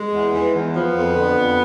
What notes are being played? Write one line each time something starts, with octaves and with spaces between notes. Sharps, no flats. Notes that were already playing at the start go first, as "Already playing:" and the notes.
Already playing: G#3
E2
E3
E2
F3 B3
F2
D3
F2